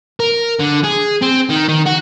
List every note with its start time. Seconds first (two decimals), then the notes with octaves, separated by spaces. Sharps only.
0.20 A#4
0.60 D3
0.84 G#4
1.22 C4
1.49 D#3
1.68 D#3
1.86 F#4